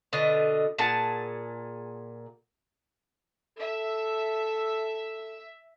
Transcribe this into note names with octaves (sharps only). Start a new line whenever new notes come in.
B2 D3 D#5
A#2 G#4 F#5 A5
A4 E5